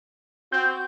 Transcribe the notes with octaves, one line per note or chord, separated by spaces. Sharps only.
C4 F#4 G6